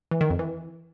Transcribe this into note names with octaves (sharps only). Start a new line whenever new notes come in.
E3
D#3
F2
E3